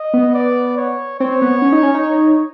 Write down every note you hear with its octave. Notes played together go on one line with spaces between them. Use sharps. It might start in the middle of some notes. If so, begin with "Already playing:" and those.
Already playing: D#5
B3
D5
C#5
C4 C#5
B3
C#4
D#4
C#4
D#4